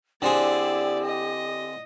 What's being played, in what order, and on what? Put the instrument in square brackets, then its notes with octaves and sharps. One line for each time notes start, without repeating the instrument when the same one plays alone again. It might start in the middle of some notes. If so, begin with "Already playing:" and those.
[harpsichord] D3 C4 G#4 [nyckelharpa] E4 D5 [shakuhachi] G4
[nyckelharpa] D#5